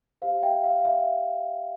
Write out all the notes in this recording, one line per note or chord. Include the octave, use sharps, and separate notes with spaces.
G4 C5 F5
E5 G5
F5
E5